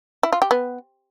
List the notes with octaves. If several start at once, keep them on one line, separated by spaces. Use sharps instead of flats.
E4
F4
G4
B3